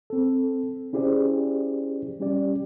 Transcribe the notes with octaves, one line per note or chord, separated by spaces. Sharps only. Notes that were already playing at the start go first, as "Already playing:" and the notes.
C4 A4
C#4 E4 G4 G#4 C5 D5
G3 C#4 G4 D5